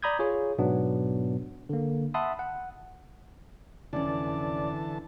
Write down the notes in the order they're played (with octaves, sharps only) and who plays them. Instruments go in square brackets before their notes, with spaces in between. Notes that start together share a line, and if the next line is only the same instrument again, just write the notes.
[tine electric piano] D5 A#5 B5 D#6 G6 G#6
F4 G#4 C#5
G#2 B2 F#3 B3 D4
D3 A#3
E5 F#5 A5 B5 C6 D#6
F#5
[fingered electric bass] F1 C#4 [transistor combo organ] D3 E3 A5 [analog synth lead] D5